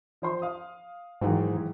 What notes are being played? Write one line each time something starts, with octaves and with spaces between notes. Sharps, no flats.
F3 C5 C6
F5 D#6
G#2 D#3 E3 F#3